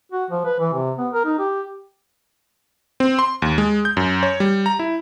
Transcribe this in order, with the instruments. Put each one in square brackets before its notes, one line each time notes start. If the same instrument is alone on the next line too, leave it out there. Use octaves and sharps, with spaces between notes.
[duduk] F#4
F3
B4
E3
C3
B3
A#4
D#4
G4
[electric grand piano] C4
C6
D#2
G#3
G6
F#2
C#5
G3
A#5
E4